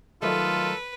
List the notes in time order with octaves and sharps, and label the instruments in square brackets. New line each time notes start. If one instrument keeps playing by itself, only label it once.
[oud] D#3 F#3 A3 [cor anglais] F4 [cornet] A4 [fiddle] B4